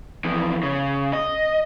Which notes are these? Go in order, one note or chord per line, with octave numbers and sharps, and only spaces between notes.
F2 E3
C#3
D#5